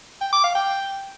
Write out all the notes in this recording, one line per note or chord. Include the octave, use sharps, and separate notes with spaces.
G5
D6
F5
G5